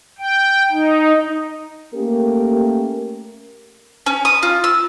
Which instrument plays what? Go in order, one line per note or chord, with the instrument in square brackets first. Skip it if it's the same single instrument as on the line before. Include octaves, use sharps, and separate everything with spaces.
[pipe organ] G5
D#4
[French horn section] A3 A#3 C#4 G4 A#4
[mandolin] C#4
D#6
F4
E6